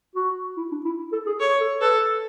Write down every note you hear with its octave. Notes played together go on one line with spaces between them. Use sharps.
F#4
E4
D4
E4
A4
G#4
A4 C#5
A4
A4 B4